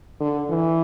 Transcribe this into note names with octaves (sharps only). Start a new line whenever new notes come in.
D3
E3